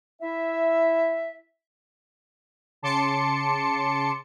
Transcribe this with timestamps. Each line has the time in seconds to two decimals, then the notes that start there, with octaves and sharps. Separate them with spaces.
0.22 E4 E5
2.82 C#3 A5 C6 D6 C#7